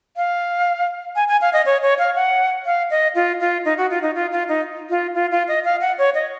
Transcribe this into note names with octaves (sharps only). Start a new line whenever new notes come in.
F5
G#5
G#5
F5
D#5
C#5
C#5
F5
F#5
F5
D#5
F4
F4
D#4
F#4
F4
D#4
F4
F4
D#4
F4
F4
F4
D#5
F5
F#5
C#5
D#5